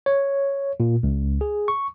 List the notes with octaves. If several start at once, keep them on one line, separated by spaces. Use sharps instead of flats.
C#5
A#2
C#2
G#4
C#6